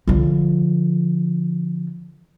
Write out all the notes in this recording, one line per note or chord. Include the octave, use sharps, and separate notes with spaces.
D3 F3